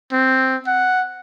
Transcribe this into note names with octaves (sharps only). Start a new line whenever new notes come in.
C4
F#5